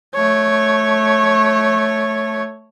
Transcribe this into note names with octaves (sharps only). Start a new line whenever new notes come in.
A3 C#5